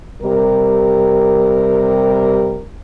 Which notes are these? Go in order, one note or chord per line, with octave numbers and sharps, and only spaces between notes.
C3 G3 A#4